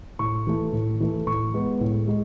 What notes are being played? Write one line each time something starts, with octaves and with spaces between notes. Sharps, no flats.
A2 C#6
E3 A3
A2
E3 A3
A2 C#6
G#3 B3
A2
G#3